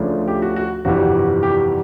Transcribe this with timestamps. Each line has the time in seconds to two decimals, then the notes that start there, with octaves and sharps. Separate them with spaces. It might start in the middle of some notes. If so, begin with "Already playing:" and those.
Already playing: D2 C#3 F3 A3 D4
0.28 G4
0.42 F#4
0.56 F#4
0.85 G1 F2 C3 E3 G3 F#4
1.43 G4